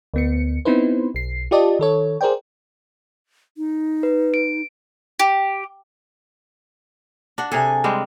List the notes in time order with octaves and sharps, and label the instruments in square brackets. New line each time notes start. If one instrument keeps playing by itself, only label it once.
[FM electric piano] D2 B3 C#7
B3 C4 D#4 E4 B4 C5
B1 C7
F4 G4 D5 D#5 A5
D#3 A4 C#5
G#4 A#4 C5 D5 G5
[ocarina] D#4
[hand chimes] B4
D7
[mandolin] G4
[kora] D4 F#5 [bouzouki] F#4
[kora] C3 G#4 A4 [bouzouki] G#5
[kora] G3 G#3 C4